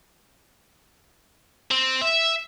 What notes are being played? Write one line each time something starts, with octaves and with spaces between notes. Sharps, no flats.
C4
E5